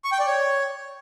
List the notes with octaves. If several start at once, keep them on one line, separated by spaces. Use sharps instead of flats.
C#6
G5
D5
C#5